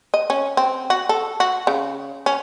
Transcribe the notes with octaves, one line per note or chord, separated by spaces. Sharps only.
D#5
C#4
C4
F#4
A4
F#4
C#3
C#4